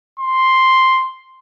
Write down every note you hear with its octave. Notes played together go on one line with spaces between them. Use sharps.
C6